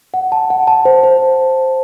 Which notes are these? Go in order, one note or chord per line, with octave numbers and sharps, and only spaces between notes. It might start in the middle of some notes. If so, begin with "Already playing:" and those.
F#5
A5
F#5
A5
C5
C5